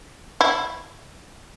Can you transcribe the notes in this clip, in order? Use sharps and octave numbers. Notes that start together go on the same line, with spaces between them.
E4